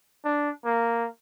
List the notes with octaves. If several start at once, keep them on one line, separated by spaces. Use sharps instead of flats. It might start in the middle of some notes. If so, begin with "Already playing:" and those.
D4
A#3